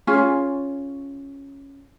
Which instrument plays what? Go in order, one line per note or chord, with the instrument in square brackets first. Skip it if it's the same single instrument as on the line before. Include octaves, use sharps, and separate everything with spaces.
[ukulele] C#4 F4 G#4